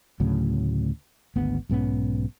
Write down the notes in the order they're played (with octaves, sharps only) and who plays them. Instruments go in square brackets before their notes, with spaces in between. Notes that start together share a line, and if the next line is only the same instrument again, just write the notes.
[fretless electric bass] D2 A2 C#3 F#3
G#1 D2 B3
B1 G#2 B3 C#4